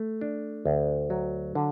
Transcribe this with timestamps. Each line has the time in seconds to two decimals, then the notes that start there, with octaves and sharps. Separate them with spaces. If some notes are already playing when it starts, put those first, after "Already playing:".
Already playing: A3
0.21 D4
0.65 D2
1.10 F#3
1.55 D3